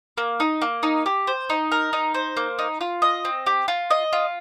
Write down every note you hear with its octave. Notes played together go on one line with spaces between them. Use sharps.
A#3
D#4
A#3
D#4
G4
C5
D#4
A#4
D#4
C5
A#3
D#4
F4
D#5
C4
G4
F4
D#5
F4